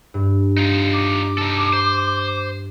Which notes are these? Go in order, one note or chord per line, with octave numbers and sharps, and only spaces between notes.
G2
D#4 F4
D6
D#4 A4
C5